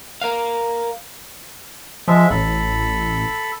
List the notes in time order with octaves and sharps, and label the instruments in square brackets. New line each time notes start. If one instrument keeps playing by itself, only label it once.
[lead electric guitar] A#4 F5
[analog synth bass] F3 [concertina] G#3 E5
[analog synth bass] A1 [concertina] A4 B5